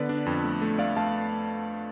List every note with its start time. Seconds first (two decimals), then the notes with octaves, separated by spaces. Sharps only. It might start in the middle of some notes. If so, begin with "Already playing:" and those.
Already playing: D3 B3 B4 D5
0.09 D4
0.26 F2
0.44 A3
0.62 A3
0.79 A3 D5 F5
0.96 A3 F5 A5